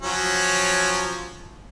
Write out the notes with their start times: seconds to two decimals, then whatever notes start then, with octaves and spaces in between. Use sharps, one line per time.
0.03 F3 F#3 C#4